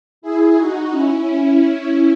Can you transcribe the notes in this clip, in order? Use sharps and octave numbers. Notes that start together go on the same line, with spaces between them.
E4 G#4
D#4 F#4
C#4 E4